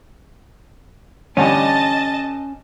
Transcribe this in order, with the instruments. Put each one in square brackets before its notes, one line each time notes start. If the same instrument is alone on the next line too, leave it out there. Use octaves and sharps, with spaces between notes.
[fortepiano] A1 D3 G3 [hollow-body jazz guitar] C#4 [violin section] D#5 A5 A6